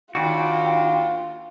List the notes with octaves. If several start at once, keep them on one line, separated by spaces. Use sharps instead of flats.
D#2 D4 F4 F#4 G5